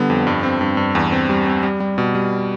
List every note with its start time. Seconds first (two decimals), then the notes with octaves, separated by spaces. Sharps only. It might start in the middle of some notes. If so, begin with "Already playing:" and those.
Already playing: D3 G3 B3
0.10 F2
0.27 G2
0.43 C4
0.61 G2
0.77 G2
0.95 E2
1.12 C4
1.29 G3
1.46 C4
1.63 G3
1.80 G3
1.98 B2
2.15 G3